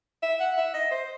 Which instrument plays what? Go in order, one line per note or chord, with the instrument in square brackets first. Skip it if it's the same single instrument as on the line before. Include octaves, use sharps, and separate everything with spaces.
[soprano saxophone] E5
F#5
E5
D#5
C5